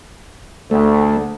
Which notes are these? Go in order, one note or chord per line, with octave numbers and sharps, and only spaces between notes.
D2 A3